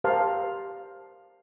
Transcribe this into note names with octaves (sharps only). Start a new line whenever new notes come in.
G4 A#4 C5 F5 A5